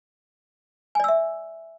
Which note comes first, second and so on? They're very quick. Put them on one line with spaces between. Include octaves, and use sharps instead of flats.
G#5 D5 E6 E5